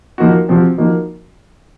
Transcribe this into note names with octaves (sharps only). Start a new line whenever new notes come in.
F3 A#3 D#4 F#4
C3 F3 C4 F#4
F3 A#3 D#4 F#4